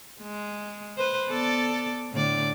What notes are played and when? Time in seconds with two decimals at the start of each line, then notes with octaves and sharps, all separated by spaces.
0.22 G#3
0.97 B4 C5
1.29 B3 A4 D5
2.12 A2 D3 D5